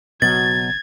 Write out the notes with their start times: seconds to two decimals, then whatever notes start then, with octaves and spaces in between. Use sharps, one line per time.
0.22 F#1 B2 F#3 G#6 A6